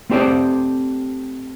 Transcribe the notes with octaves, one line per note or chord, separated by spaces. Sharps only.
A3 C4 G4 C5 D5